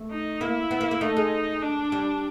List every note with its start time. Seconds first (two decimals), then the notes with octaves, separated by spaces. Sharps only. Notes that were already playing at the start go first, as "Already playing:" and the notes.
Already playing: A3
0.10 D#4
0.41 A#3 E4
0.71 B3
0.81 A#3
0.91 A#3
1.01 A3 D#4
1.17 G#3
1.62 D4
1.92 G3